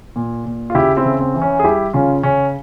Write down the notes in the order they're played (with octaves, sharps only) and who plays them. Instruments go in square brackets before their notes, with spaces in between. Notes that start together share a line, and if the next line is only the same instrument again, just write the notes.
[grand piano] A#2
A#2
F4
C#3 E4 G4
C4 E4
C#3
C4
E3
C#4
G#4
G3 E4 G4
C#3 C#4 F4
C#3 C#4